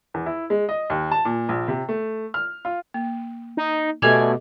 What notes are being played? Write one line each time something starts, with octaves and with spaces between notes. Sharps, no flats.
E2
E4
G#3
D#5
D#2
A5
A#2
A#1
C3
A3
F6
F4
A#3
D#4
B2 A3 G4 A4 D5 D#5 G#5